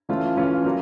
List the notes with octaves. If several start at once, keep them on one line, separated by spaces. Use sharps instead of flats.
E3 A3 C#4 F4
E3 A3 C#4 F4
F#3 A#3